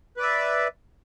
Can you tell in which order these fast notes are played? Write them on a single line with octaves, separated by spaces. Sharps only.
B4 D5 E5